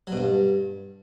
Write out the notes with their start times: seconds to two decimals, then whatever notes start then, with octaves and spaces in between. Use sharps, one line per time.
0.07 F#3
0.12 B2
0.17 G2